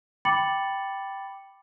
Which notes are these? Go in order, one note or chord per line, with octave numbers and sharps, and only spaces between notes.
G5 B5 D6 A6 C#7 F#7